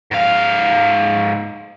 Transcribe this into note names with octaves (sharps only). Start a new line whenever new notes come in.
G#2 F5